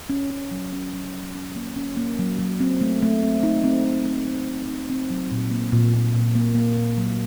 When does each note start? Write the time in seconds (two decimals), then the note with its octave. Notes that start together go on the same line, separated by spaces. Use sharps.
0.10 C#4
0.30 C#4
0.51 F#3
0.73 C#4
0.93 F#3
1.14 F#3
1.35 C#4
1.56 A#3
1.76 C#4
1.97 A#3
2.19 F#3
2.39 F#3
2.60 C4
2.81 A3
3.02 A3
3.23 C4
3.43 D#4
3.64 C4
3.84 A3
4.05 A3
4.27 A3
4.48 A3
4.68 D#4
4.90 C4
5.10 F#3
5.31 A#2
5.51 A#3
5.72 A#2
5.94 A#2
6.15 A#2
6.35 A#3
6.55 A#3
6.77 A#2
6.97 F#3